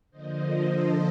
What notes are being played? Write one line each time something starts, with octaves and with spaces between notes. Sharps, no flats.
D3 F3 A#3 C5 D#5
A4 C5